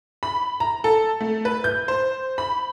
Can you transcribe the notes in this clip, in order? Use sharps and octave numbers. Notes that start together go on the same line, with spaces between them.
B5
A#5
A4
A3
B4
G6
C5
B5